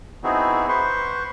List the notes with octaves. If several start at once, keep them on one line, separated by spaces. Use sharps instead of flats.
B3 C4 D#4 E4 F#4 G#4
B4 C5 C6 C#6